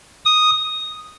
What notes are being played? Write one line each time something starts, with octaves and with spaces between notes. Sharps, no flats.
D#6